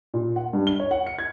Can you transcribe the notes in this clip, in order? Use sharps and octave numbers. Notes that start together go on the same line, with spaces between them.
A#2
F#5
G2
G7
C#5
F#5
C#7
G#6